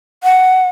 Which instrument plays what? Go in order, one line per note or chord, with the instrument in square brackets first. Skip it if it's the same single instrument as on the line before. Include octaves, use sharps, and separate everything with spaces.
[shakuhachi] F#5